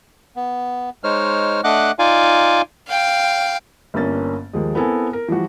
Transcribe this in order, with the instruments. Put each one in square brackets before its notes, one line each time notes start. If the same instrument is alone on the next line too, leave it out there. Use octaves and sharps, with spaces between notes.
[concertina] B3
G#3 D#4 C5 C#5 F6
A3 D4 D#5 F#5 D6 F#6
D#4 F4 D5 F5 G#5
[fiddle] F5 G5
[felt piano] G1 G2 A#3 C#4 A6
D#2 F3 G#3
B3 C4 E4 A4 A#4 G#5
A#4
E3 F3 G3 F#4